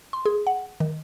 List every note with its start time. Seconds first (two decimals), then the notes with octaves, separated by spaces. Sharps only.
0.13 C6
0.26 G#4
0.47 F#5
0.80 D#3